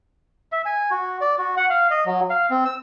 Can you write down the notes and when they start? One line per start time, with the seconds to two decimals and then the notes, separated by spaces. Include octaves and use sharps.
0.52 E5
0.66 G#5
0.91 F#4
1.21 D5
1.38 F#4
1.57 F#5
1.70 F5
1.91 D#5
2.06 F#3
2.30 F5
2.50 C4
2.65 E6